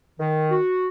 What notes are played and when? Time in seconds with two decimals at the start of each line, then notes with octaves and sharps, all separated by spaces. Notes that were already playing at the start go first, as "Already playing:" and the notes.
0.20 D#3
0.51 F#4